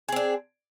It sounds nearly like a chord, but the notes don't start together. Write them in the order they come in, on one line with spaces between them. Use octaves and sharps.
G#4 C4 D4